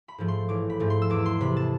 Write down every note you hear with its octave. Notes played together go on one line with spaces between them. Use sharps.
B5
G#2 F3 A3
C6
A1 D6
B5
G#2 F3 A3
C6
E6
E2 D6
C6
C3 E3 B5
A5